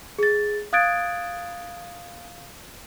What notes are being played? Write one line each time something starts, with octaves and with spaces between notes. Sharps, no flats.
G#4 A6
F5 D#6 F#6 G#6 A6 D7